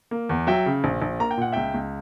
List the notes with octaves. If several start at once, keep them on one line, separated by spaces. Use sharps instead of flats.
A#3
E2
F#3 E5 G5
C#3
A#1
A#1
A#3 A#5
G5
A#2 F#5
C#2 E5 G5
C#2